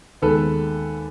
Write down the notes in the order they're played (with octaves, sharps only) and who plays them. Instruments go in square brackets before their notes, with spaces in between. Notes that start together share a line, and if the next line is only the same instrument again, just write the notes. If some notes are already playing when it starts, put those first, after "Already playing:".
[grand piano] D#2 D#3 G#3 B3 A4 B4